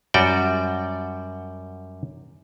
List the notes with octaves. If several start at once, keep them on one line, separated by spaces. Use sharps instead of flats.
F#2 G3 F#4 D5 G5